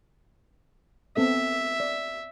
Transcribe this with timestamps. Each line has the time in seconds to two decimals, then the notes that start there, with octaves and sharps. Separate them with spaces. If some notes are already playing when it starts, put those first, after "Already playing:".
1.17 B3 C4 A4 E5
1.80 D5